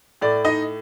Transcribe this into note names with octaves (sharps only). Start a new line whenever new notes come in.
A2 A3 D5
D#4 D#5